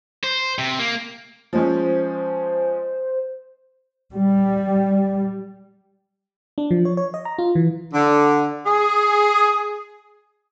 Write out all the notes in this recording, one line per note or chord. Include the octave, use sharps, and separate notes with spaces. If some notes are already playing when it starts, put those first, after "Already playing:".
C5
C3
A#3
F3 G#3 C#4 C5
G3
D4
F3
C#5
C#5
D#5
A#5
F4
E3
D3
G#4